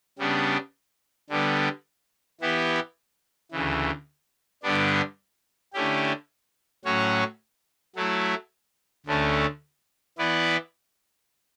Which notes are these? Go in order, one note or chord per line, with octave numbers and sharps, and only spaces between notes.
C#3 G3 B3 D4
D3 G3 B3
E3 B3 E4 G4
D2 C#3 E3
G2 D3 G3 B3 D4
D3 A3 C#4 E4 G4
A2 F#3 C#4 F#4 C#5
F#3 A3 E4
D2 D3 A3 C#4
E3 B3 E4 B4 D5